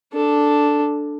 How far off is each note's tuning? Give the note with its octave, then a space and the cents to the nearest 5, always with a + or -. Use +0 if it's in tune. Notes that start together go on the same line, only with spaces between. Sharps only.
D4 +0 A4 +0